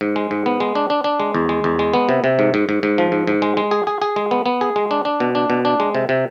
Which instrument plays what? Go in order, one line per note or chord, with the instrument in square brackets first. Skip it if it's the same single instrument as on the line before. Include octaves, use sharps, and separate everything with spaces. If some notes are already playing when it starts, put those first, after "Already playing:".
[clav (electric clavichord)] G#2
G#3
G#2
B3
G#3
D4
D4
D4
G#3
E2
G#3
E2
G#3
B3
C3
C3
G#2
G#2
G#2
G#2
F3
G#2
G#2
G#3
G#3
G#4
G#4
G#4
G#3
B3
B3
G#4
G#3
D4
D4
B2
D4
B2
D4
G#3
C3
C3